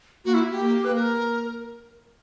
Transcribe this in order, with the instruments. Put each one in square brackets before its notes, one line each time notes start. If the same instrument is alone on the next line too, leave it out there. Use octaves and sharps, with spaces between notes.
[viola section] A#3 [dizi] F#4
[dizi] E4
G4
[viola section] A#3
[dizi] B4
A#4